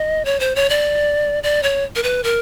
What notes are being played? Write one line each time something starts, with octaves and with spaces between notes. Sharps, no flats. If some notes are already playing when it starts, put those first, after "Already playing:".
Already playing: D#5
C#5
C5
C#5
D5
D5
C#5
A#4
B4
A#4